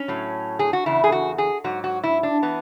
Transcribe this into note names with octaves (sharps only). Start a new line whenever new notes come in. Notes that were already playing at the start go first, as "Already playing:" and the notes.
Already playing: C#4
A2 F#3
G#4
F#4
E2 C#3 E4
G#4
F#4
G#4
G#2 F#3 F#4
F#4
E4
D4
E3 B3